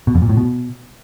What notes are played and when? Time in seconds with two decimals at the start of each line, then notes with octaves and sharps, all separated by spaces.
0.07 B2
0.15 F2
0.22 A#2
0.29 A2
0.37 B2